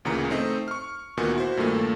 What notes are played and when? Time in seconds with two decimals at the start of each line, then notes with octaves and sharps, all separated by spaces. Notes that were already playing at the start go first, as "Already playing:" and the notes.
0.05 D2 A#2 C#3 E3 A#5 C#7
0.30 A3 C4 D#4 C5 D#5
0.68 C#6 F6
1.17 D2 A#2 D#3 B3 F#4 G#5
1.36 E4 F#4 C5
1.57 G2 A#2 D#3 A3 A#3